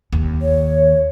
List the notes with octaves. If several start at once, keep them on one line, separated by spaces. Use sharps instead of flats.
D#2
C#5